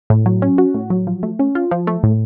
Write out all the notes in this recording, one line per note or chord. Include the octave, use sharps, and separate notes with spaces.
A2
F#3
C#4
F#4
A2
F#3
F3
A3
C#4
F4
F3
A3
A2